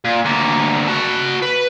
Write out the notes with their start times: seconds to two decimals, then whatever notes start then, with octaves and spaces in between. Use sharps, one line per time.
0.05 A#2
0.25 D2 A#3
0.88 F#4 A5
1.42 B4